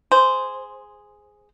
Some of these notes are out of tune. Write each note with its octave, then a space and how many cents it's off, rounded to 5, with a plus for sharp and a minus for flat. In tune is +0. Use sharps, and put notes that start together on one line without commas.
G#4 +0 C5 -10